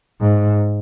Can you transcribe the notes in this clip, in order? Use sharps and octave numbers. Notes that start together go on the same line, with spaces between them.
G#2